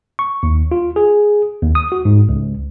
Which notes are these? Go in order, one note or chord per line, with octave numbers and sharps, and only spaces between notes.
C#6
D#2
F4
G#4
D#2
D#6
F#4
G#2
C#2